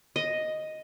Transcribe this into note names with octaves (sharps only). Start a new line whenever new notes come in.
D#5